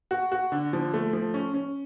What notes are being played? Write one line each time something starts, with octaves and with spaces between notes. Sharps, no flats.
F#4
F#4
D3
F3
A3
F3
C#4
C#4